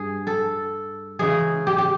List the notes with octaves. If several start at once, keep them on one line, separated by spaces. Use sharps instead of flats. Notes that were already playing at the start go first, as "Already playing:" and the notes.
Already playing: G2 G#4
A4
C#3 E3 G#3 G#4
G4
G4